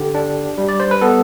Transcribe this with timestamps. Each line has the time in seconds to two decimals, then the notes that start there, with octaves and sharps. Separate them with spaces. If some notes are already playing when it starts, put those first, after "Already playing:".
Already playing: D3 G4
0.15 D4
0.58 G3
0.69 D5
0.80 C5
0.91 B4
1.01 B3 A4